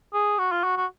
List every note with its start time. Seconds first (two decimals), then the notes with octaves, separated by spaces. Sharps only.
0.13 G#4
0.38 F#4
0.51 F4
0.64 F#4
0.77 F#4